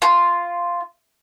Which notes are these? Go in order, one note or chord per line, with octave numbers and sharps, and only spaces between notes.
F4